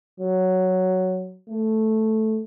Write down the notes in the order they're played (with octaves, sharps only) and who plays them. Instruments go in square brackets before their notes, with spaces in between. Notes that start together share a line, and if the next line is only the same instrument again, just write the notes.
[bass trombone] F#3
A3